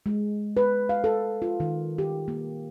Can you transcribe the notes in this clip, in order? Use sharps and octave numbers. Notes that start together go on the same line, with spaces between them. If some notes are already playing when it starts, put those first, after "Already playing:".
G#3
B4
F5
A4
F4
D#3
G4
A#3